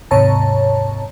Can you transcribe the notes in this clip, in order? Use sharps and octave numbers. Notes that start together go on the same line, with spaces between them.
D#2 G#2 C3 C#5 A5 A#5